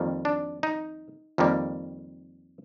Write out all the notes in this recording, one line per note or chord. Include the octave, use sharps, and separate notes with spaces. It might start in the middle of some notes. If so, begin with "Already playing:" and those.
Already playing: F2 D#3 G3 A#3
D4
D#4
F2 D#3 G3 A#3